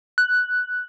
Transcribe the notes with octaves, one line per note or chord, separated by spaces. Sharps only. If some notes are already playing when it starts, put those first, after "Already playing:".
F#6